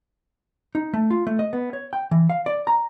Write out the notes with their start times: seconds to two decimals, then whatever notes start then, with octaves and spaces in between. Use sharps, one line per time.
0.75 D#4
0.94 A3
1.11 F4
1.27 A3
1.39 D#5
1.53 B3
1.73 C#5
1.93 G5
2.11 E3
2.30 F5
2.46 D5
2.67 A#5